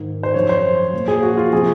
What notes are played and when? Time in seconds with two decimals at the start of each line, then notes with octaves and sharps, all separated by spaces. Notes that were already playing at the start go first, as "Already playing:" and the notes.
Already playing: G#2 D#3
0.23 C5
0.34 F#2 F3 C#5
0.49 C5
0.93 A#2 F3
1.08 G#4
1.23 F#4
1.37 F4
1.52 C3 F3 G#4